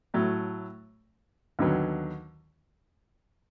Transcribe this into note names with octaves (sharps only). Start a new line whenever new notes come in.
A2 F#3 A3
D#2 D3 F#3 B3